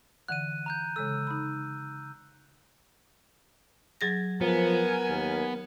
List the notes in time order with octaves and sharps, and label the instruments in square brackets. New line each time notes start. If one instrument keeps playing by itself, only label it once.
[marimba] D3 E3 F#5 [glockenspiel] F#6 D#7
[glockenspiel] A#5 F#6 G6
[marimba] C#3 G#3 A4 [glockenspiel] E6
[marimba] D#4 B5
F#3 G#4 A#6
[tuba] F3 [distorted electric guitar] B3 [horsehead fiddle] A#4 G#5
[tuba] D#2